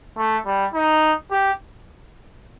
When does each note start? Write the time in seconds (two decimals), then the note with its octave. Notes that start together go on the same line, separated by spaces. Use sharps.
0.17 A3
0.46 G3
0.74 D#4
1.31 G4